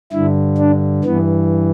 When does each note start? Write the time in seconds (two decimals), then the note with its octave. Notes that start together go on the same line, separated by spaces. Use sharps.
0.13 G2 D3 E4
0.58 D4
1.04 G2 E3 B3